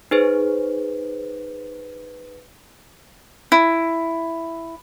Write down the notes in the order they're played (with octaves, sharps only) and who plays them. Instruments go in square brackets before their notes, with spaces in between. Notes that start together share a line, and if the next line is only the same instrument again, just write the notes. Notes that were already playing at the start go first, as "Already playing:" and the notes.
[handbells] D#4 G#4 C5 [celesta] B4
[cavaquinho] E4